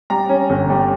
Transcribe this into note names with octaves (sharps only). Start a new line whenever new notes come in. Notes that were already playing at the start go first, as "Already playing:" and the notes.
G3 A#5
C#4
G1
G3